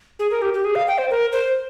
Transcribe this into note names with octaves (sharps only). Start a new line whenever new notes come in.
G#4
A#4
G4
G4
G#4
F5
G5
C5
A#4
C5